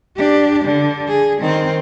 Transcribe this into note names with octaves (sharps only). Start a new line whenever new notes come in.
D4 G4
D3
G#4
D#3 C4